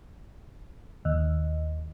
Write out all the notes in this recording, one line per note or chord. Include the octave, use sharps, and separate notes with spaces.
D#2